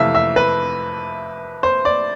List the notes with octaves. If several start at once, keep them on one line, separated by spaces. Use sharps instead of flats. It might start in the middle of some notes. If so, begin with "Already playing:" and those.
Already playing: F2 C3 E3 A3 E5 F5
E5
B4
C5
D5